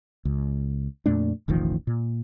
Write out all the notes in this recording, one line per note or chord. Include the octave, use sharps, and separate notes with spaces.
C#2
F2 A#2 A3 D4
E1 A1 D#3 F3
A#2